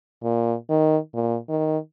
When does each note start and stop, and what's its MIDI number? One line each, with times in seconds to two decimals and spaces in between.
0.23 0.54 46
0.70 0.97 51
1.14 1.37 46
1.49 1.77 51